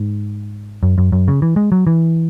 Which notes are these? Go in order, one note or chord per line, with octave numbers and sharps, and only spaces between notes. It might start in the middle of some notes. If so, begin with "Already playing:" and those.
Already playing: G#2
F#2
F#2
F#2
C#3
E3
G#3
F#3
E3